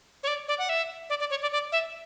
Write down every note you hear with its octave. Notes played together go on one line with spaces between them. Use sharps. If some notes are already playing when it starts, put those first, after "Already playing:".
C#5
D5
D5
F#5
E5
D5
D5
C#5
D5
D5
E5